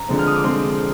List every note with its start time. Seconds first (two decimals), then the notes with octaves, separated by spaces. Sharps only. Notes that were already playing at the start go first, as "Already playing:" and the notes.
Already playing: A#5
0.09 D3 F3 G#3 C4
0.19 F6
0.27 D#6
0.36 D6
0.44 D3 F3 G#3 C4 C6